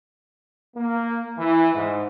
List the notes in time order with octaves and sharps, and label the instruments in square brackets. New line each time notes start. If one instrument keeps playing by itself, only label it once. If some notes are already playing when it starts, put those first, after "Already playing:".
[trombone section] A#3
E3
G#2